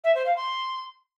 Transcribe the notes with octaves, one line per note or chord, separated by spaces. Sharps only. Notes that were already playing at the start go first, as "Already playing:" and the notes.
E5
C5
F5
C6